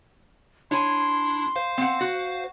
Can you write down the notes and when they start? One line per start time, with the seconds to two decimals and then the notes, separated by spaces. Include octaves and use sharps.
0.71 D4 E4 C#5 G#5 C6
1.56 C5 F5
1.78 C4 F#5
2.01 F#4